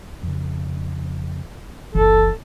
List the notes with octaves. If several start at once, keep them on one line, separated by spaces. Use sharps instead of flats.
F2 C#3
F#1 C#2 E3 A4